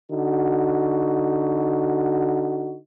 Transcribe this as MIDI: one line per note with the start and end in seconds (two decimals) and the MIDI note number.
0.11 2.77 50
0.11 2.77 63
0.11 2.77 66